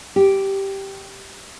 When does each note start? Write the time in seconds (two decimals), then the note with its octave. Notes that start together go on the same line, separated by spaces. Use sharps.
0.16 G4